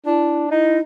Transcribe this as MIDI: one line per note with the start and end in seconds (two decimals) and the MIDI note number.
0.06 0.49 62
0.06 0.46 64
0.51 0.81 63
0.51 0.79 64